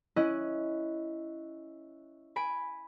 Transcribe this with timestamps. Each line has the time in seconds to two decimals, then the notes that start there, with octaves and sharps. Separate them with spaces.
0.16 C#4 E4 D#5 F#6
2.36 G#5 B5 D7